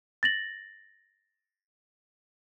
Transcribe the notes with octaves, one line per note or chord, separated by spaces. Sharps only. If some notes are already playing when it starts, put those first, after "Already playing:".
A6 A#6 F#7